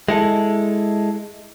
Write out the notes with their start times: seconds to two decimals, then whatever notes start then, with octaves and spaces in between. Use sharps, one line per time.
0.08 G#3 E4 A4